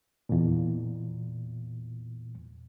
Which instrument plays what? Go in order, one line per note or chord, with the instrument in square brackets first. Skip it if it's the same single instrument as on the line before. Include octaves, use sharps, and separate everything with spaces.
[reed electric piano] E2 A#2